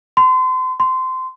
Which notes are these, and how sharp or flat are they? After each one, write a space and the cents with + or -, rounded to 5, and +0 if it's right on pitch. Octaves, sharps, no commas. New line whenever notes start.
C6 -35
C6 -20